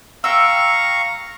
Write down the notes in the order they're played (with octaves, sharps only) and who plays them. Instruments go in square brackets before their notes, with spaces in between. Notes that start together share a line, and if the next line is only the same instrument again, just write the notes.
[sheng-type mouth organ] F5 A#5 C#6 [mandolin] G5 E6